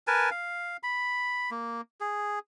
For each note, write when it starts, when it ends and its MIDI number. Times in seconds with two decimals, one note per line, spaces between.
0.07 0.30 70
0.07 0.30 71
0.07 0.30 80
0.07 0.30 81
0.31 0.77 77
0.83 1.50 83
1.51 1.81 58
2.00 2.39 68